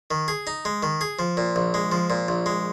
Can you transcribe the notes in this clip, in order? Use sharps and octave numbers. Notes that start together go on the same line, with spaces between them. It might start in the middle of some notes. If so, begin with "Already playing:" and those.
D#3
G#4
D#4
G#3
D#3
G#4
F3
A#2
A#1
G#3
F3
A#2
A#1
G#3